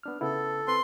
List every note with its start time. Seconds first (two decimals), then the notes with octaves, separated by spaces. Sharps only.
0.03 B3 D4 F6
0.21 C#3 B3 E4 A4
0.68 C4 B4 C6